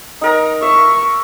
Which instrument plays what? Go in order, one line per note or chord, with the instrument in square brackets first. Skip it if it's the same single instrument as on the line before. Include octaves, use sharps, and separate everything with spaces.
[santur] D#4 A#4 A#5
[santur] E5 [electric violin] C#6